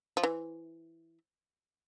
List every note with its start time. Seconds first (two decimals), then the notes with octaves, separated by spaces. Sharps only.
0.17 F3
0.23 E3